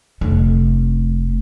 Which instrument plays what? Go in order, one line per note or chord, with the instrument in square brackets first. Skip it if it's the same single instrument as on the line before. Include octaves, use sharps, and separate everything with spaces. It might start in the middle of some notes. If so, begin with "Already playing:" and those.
[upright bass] F1 A3